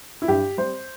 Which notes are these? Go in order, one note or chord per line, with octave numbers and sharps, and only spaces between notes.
E4
G2 G4
G3 C5